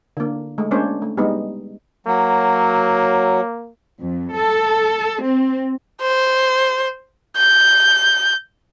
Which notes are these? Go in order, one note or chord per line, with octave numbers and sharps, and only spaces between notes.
D3 A#3
G#3 A3
G#3 A#3 C#4 D4 C5 C#5
A3
G3 G#3 B3 D#4
F#3 A#3
F2
A4
C4
C5
G6